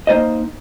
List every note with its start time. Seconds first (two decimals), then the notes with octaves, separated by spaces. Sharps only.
0.07 A#3 D#4 C5 D#5